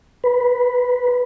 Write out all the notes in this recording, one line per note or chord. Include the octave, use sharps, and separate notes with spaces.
B4